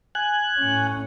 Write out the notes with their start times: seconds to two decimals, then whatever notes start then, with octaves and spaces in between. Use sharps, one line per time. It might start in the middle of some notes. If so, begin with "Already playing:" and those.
0.15 G#5 F#6
0.59 A2 C#4